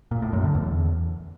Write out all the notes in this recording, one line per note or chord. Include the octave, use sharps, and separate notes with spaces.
A#2
A2
F#2
D3
E2